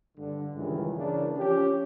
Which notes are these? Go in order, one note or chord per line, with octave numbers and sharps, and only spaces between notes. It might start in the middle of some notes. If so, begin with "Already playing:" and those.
G2 D3
C#2 G2 D#3 E3
C#3 E3 A#3 D4
F3 C#4 G4